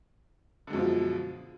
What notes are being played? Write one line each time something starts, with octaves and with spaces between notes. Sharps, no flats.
F#2 B2 D3 F3 G#3